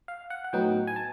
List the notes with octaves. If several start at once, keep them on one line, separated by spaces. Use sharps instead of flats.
F5
F#5
F#5
A2 F#3 B3 D#4 G5
G#5
A5